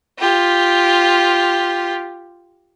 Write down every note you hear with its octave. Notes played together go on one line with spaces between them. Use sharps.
F4 G4